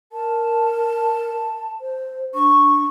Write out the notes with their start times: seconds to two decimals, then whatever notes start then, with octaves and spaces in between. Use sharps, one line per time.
0.12 A#4 A5
1.81 C5
2.34 D4 C#6